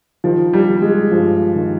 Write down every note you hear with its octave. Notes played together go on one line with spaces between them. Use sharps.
D#3 F3
G3
D#3
G#3
G2 F3
D#3